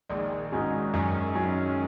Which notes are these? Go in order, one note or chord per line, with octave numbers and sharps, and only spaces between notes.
A#1 D#3 G#3
G#2 G#3 C#4 F#4
F#2 G#3 C#4
F#3 C#4